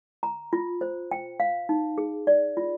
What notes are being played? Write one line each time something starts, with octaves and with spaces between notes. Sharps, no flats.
A#5
F4
C5
G5
F5
D#4
G#4
D5
F4